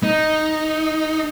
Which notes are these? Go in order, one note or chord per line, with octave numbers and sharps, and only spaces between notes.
D#4